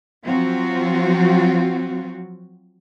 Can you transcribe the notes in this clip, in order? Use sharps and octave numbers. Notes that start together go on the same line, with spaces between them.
F3 F#3 C4 F4 F#4